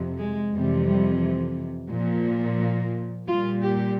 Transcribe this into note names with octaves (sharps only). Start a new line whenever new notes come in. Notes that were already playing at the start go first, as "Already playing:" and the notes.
Already playing: F2 C3
G#3
F2 C3 E3 G3
G3
A#2 F3
A#3
A#2 G3 F4
G4